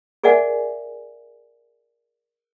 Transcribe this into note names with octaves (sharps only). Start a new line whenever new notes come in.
G#4 A#4 D5 E5 F#5 G#5